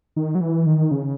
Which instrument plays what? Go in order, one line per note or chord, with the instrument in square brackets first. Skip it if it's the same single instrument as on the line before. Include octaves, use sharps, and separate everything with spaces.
[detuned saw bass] D#3
F#3
E3
D#3
C#3